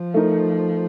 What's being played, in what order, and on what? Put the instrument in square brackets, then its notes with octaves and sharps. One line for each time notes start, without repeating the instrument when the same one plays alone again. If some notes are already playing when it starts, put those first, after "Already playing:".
Already playing: [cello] F3
[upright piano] A3 D#4 A#4